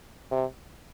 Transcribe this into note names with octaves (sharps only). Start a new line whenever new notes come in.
C3